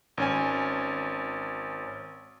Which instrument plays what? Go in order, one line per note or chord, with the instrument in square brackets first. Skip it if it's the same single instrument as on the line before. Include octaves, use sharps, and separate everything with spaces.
[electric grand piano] G#1 C#4 G#5